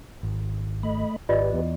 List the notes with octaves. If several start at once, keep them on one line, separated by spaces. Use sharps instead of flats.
G#1
A3 D#5 B5
G#1 F4 G4 B4 D5 D#5
E2